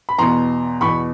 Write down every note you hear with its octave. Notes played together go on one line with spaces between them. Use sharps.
B5
E2 B2 A#5 C6
E2 B2 B5 C#6